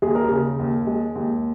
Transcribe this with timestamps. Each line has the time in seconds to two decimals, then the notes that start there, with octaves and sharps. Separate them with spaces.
0.02 D#2 G#4
0.15 A#4
0.28 C#3 G#4
0.59 D#2
0.87 G#3
1.15 D#2